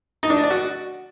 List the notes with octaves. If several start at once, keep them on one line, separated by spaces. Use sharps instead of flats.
D#4
D4
D#5
D5
F#4